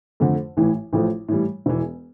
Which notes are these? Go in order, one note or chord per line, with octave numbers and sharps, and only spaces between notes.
F2 D3 A3
A1 A2 E3
A1 A2 F3 A3
A2 E3 G3
E1 E2 E3